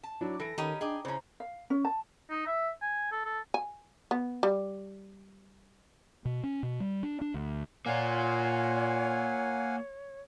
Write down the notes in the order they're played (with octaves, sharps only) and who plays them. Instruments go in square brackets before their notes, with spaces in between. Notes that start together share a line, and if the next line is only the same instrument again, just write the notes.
[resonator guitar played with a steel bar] A5
[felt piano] F#3 D4 E4 [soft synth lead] D6
[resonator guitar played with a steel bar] E3 [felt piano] A4 D7 [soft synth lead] A#6
[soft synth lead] D#3 [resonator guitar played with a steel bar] C#4 G4 [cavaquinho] D#4 B5 D#6
[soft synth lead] D4 [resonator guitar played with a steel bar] G#4 D#5 [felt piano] G5 D6
[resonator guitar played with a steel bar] C#3 C#4 [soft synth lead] E4 [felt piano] C5 A#5
[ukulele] F5
C#4
A5
[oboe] D#4
E5
G#5
A4
A4
[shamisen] G#5
B3
G3
[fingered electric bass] B2
C#4
B2
G3
D4
D4
D2
[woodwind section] A#2 [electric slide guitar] A#3 F4 [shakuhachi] C#5 [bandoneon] F5 F#5 G#5